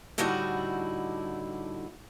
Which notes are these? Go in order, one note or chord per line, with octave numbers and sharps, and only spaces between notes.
A2 D3 G3 D#4 E4 F#4